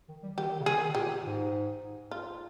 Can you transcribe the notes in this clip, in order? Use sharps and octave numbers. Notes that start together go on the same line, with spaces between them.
D#3
G3
D#3 G4
C#3
D#3 G#4
A#2 G4
G#2
F4